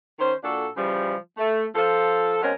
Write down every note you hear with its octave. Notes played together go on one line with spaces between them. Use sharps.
D#3 C#4 C5
A#2 D4 F#4 A4
C#3 E3 F3 G3
A3
F3 A4
B2 G#3 C4 C#4 A#4